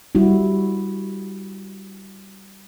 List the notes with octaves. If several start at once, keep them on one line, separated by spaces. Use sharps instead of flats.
G3 E4 F#4